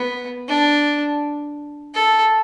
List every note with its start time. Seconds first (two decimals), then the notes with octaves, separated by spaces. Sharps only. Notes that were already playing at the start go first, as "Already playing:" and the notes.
Already playing: B3
0.49 D4
1.95 A4